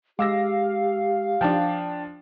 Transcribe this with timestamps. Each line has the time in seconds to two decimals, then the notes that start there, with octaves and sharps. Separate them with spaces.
0.19 G#3 G4 F5 D6 E6 A#6
1.41 F3 D4 G5 A5